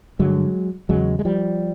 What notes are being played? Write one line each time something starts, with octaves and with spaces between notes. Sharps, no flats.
G2 D3 F#3 G#3
E2 C#3 F#3 G#3
G#3
F3 G3